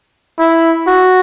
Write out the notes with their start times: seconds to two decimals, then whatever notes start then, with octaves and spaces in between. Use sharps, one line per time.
0.39 E4
0.87 F#4